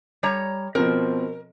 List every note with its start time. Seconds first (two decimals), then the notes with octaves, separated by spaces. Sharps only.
0.23 G3 C#5 A#5
0.75 B2 F3 C4 A#4